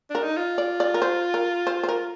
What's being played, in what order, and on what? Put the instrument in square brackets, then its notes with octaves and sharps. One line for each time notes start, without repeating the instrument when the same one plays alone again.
[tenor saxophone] D4 [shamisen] A#4
[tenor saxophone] D#4
F4
[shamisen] D5
D5
A#4
C5
A#4
C5
C5
A#4